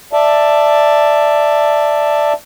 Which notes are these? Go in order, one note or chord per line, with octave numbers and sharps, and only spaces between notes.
D5 E5 A5